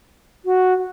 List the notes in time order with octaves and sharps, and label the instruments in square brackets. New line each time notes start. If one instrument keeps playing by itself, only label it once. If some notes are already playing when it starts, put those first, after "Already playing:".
[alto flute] F#4